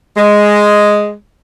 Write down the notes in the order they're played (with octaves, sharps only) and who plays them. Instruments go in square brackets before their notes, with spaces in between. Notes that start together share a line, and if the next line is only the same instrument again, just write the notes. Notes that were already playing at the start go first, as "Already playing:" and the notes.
[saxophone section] G#3